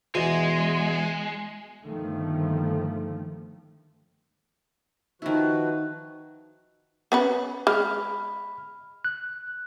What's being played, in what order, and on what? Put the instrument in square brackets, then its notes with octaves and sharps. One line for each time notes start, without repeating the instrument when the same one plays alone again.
[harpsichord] E2 B2 [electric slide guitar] G#3 [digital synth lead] G#5
[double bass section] G1 D#3 F3 A3
[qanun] D#3 E4 [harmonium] F3 F#4 B4
[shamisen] B3 C#4 B4
[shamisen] G#3 [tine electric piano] B5 F6
[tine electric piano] F#6